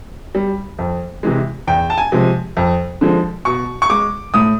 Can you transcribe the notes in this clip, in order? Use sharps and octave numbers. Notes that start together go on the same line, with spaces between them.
G3
F2
C3 E3 G#3
E2 G5
A5
G#5
C3 F3 G#3
F2
D3 F3 G#3
B2 C#6
C#6
G#3 D6
A2 D#6